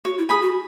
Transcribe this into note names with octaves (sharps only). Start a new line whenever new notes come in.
F#4 C#5
E4
G#4 G#5 B5 D#6
F#4